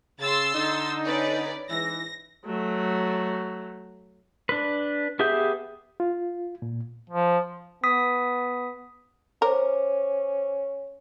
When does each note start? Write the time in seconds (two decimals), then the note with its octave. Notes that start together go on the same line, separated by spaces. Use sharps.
0.20 C#3 C6 E6 A6
0.54 D3 D#4
1.04 C#4 B4 D5
1.69 G#2 E3 A#6
2.45 F#3 A3
4.49 D4 B4
5.19 B3 G4 G#4 E5 G6
6.00 F4
6.62 A#2
7.10 F3
7.84 B3 D#6 B6
9.42 C#4 A#4 C5 D6